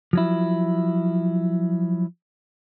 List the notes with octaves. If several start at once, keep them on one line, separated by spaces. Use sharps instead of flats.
F3 F#3 E4